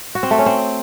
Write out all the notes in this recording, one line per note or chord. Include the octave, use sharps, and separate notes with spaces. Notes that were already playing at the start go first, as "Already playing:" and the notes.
F#4
C4
A3
C#4
C4